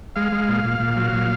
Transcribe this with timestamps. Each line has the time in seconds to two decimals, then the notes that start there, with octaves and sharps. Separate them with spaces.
0.16 G#3 F5
0.32 G#3
0.48 A#2
0.65 A#2
0.80 A#2
0.97 F#3
1.13 A#2